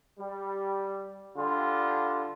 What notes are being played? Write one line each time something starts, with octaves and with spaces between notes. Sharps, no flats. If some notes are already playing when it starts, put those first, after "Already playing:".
G3
D3 G3 F4